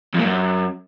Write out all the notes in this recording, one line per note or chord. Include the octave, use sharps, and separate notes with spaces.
F2
A#2
F#2